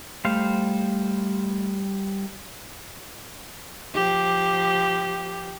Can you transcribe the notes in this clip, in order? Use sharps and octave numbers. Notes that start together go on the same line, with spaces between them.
G3 A3 C5 F5
F3 G4